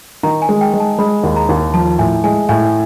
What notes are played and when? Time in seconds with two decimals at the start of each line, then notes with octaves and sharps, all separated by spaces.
0.23 D#3 A#5
0.42 G#5
0.49 G#3
0.61 G5
0.74 G#3
0.80 A5
0.99 G#3 B5
1.23 D#2
1.36 A#5
1.49 D#2
1.74 F3 A5
1.99 A2 G#5
2.24 G#3 G#5
2.49 A2 G#5